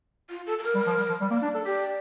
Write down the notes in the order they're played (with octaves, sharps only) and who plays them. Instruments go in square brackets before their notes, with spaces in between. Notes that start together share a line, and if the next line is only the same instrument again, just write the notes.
[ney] F4
A4
A4
A#4
[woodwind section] G3
F3
G3
F3
G3
[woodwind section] A#3 [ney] D5
[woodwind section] D4
A4
[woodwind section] G4 [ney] D5